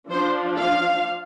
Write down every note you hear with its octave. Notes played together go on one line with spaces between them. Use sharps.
F3 D4 C5
F5